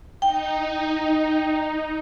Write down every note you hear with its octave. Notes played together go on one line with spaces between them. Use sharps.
D#4 G5